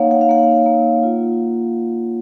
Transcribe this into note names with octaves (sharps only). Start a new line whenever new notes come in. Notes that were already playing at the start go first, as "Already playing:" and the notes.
Already playing: A#3 D#4 C#5 F5 F#5
F#5
F5
A#3 F#5
A#3
F4